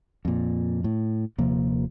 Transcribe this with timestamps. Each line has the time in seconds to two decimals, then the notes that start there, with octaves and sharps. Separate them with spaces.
0.25 F2 A#2
0.84 A2
1.38 D#1 C3 F3 A#3